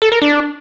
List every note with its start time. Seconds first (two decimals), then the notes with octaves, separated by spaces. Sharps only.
0.02 A4
0.12 A#4
0.22 D4